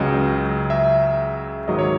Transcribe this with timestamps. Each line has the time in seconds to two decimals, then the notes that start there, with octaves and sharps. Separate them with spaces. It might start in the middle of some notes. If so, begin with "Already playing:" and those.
Already playing: C#2 C#3 F#3 D#5
0.70 E5
1.68 G#2 D#3 F#3 D#5
1.79 C#5